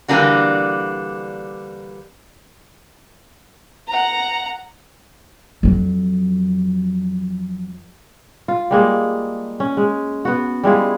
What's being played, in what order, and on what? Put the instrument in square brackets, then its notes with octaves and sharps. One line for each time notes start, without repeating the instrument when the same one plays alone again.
[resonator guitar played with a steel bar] D3 E3 G3 A#3 D4 F#4
[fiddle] F#5 A#5
[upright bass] F2 F#3
[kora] F4
G3 G#3 A#3
C#4
G#3
B3 F#4
G3 G#3 E4 F4